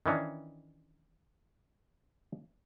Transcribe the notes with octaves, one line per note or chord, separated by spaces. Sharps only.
D#3 E3 C#4 D4